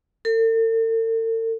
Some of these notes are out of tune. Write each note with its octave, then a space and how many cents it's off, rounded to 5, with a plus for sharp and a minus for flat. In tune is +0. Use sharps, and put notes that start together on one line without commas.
A4 +45